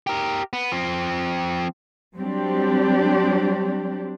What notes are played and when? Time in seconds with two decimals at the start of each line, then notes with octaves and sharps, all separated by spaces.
0.07 G4 A#4
0.53 B3
0.72 F3 C4
2.16 F#3 G3 C4 D4 G4